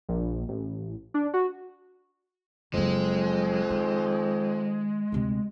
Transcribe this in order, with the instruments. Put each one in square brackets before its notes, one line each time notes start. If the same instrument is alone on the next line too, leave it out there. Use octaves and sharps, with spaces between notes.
[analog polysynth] A#1
A1
D4
F#4
[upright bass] F#1 F#3 [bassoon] F2 [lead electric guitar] G#3
[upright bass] D#3
D2 C3